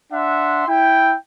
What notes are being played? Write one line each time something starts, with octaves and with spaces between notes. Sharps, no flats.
D4 E5 F#5 C6
E4 G5